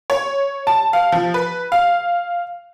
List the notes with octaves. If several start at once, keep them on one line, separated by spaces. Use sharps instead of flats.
C#5
A5
F5
F3
B4
F5